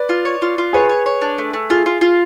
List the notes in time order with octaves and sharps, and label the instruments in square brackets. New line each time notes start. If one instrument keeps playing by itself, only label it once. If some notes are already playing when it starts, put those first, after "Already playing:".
Already playing: [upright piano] B4 D5
[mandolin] F4
C#5
F4
F4
[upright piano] G#4 B4 [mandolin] C#5
[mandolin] C#5
C#5
D4
A3
A3
[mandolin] F4 [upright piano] G#4
[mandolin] F4
F4